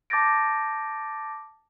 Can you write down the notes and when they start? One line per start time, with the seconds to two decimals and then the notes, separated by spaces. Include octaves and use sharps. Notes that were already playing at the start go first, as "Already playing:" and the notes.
0.10 A5 D6 G6 A6 A#6 D7